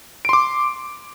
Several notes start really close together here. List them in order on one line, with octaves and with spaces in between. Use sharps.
D7 C6 D6